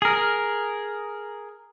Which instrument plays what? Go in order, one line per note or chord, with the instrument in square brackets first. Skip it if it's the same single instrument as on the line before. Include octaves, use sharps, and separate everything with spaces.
[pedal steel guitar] G#4 A#4